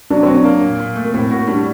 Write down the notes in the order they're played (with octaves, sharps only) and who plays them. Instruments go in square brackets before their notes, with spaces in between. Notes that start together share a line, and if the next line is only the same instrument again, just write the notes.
[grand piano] F#3 [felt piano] D4
[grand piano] F#3 [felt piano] C4
[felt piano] D4
[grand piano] A#3
A#2
A#2
A3
[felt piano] A#3
[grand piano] A2 [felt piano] C4
[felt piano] A#3 [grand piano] F#4
[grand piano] G3 [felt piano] D4